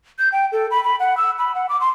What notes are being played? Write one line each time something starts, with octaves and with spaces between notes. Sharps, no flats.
G6
G5
A4
B5
B5
F#5
E6
B5
F#5
D6
C6